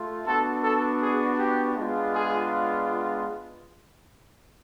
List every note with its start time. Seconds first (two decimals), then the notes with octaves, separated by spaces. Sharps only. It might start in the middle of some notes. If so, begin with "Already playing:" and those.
Already playing: A3 F4
0.26 B3 D4 F#4 A4
0.64 A4
1.01 G#4
1.39 G4
1.77 G#3 B3 D4 F4
2.14 G#4